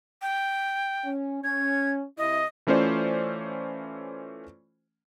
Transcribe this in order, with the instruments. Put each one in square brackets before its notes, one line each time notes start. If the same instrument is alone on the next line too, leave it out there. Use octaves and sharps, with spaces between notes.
[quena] G5
[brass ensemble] C#4
[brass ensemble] C#4 [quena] G#6
[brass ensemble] C3 E4 [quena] D#5
[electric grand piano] E3 A3 C#4 F4 C5 D5